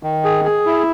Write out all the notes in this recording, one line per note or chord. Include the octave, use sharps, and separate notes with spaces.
D#3
G#4
G#4
E4